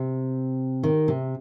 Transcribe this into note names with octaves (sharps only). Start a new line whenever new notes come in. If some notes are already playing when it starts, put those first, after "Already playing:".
Already playing: C3
D#3
C3